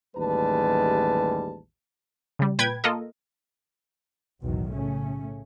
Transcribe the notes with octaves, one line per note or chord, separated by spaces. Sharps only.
A1 D#2 G3 G#3 B4 A5
C#3 G3
A#2 B4 G5 G#6
A#3 F4 A4 A#4 D#5
B1 E2 A2 D#3 F#3
A2 C#3 A3 C#4